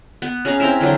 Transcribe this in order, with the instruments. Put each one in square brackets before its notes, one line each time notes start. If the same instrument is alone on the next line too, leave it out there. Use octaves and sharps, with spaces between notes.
[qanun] B3
C#4 G#4 F5 A#5
C4 E4 A#4 E5
D3 E3 F#3 C6